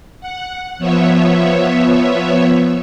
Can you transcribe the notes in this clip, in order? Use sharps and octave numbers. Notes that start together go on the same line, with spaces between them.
F#5
F3 B3 C#5 E5